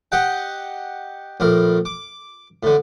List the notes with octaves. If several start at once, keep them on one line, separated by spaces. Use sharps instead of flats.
G4 D#5 F#5 G5
A#1 A2 A#4
D6
A2 D3